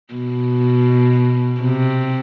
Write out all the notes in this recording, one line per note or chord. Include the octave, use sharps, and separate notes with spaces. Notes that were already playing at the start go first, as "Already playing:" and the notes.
B2
C3